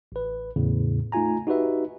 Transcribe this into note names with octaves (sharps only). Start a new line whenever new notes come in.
A1 B4
E2 A2 C#3
A3 D#4 F4 G#5 A#5
D#4 F#4 G4 B4 E5